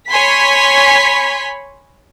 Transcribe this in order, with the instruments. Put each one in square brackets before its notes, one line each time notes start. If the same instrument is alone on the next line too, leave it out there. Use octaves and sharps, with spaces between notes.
[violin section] C#5 G#5 B5 C6 B6